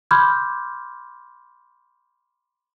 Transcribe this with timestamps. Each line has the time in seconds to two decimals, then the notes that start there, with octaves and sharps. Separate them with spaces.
0.11 B5 C6 D6 F6 G6 G#6